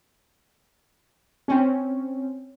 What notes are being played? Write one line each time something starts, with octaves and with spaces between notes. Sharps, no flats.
C4 C#4